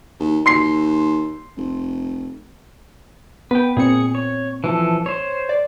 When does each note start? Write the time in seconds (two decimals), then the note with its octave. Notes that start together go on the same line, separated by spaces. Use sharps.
0.19 D#2
0.46 D#2 C6 C7
1.57 F1
3.51 B3 B4 G5
3.77 A#2 C4 G#4 C#7
4.15 C#5
4.64 E3 F3 A4
5.06 C5 C#5
5.49 D5